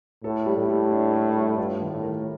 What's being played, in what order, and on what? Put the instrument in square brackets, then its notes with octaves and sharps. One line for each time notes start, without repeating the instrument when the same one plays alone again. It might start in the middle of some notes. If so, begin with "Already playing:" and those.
[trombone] A2 [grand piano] A4
[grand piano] G3
[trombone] A2
[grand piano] G3
D4
A4
G3
[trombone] G2 [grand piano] F4
[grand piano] D#3
[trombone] A2
[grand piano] A#4